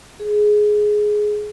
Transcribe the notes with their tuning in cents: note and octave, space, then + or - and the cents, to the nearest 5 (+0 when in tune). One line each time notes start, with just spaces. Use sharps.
G#4 +10